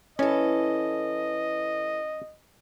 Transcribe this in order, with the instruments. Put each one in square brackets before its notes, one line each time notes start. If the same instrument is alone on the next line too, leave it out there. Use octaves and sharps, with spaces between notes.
[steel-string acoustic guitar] E3 A4 [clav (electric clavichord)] C#4 [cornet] D#5